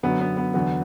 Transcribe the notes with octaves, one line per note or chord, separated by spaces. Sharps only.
F#2 D3 F#3 B3
B3
B3
E2 D3 F#3 B3